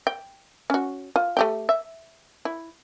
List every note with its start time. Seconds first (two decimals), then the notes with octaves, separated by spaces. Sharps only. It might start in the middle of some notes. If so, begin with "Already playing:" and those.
0.07 G5
0.70 C#4 F#4
1.16 F4
1.37 A3 G4 G5
1.69 E5
2.45 E4